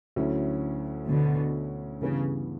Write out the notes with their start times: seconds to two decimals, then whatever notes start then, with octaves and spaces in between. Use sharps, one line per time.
0.16 D2 D3 F#3 C#4 E4
1.10 B2 D3
2.02 G2 C#3 E3 B3